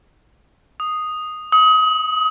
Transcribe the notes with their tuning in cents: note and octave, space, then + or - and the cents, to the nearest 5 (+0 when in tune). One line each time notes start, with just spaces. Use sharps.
D#6 -5
D#6 +30